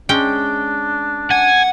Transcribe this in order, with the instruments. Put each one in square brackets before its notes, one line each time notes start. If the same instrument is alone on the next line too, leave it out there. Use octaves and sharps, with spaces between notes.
[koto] G#3 C#4 G5 [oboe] D4
[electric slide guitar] F#5 [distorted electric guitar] G#5